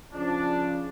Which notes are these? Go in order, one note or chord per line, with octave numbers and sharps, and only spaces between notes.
C#3 F3 D4